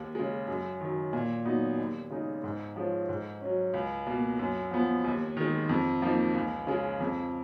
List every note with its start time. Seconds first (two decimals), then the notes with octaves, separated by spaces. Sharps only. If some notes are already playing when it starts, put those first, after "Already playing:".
Already playing: D#2
0.15 C#3 G#3
0.48 F#2
0.81 D#3 F#3
1.13 A#2
1.45 F#3 B3 D#4
1.78 D#2
2.11 C#3 G#3 D#4
2.44 G#2
2.76 F3 G#3 C#4
3.09 G#2
3.41 F#3 C#4
3.74 C#2
4.07 B2 A#3
4.39 F#2
4.71 F3 B3
5.04 D#2
5.37 D#3 G#3
5.69 F2
6.02 F3 A#3 D#4
6.34 C#2
6.67 C#3 G#3
7.00 F2